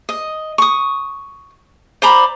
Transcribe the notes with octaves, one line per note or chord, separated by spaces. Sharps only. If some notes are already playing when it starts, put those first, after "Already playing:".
D#5
C#6 D#6
C5 D5 A#5 B5